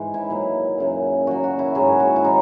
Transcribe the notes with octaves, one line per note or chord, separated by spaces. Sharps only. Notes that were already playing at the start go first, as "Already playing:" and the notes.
Already playing: G#2 E3 G#3
E4
A#2 F#3
F#2 C#3 F#3
A#2 F#3 F#4
F#4
E4
G#2 F#3 G#4
F#4
E4
D#3 F#3 D#4